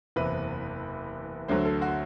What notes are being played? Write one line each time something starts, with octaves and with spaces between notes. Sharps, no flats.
F#1 E2 C3 B4
D2 D3 F#3 C5
A4
F#4